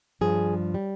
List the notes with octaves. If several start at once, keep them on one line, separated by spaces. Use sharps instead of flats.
G2 F3 G#4
G3